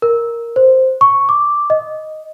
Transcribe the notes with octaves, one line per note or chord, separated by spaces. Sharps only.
A#4
C5
C#6
D6
D#5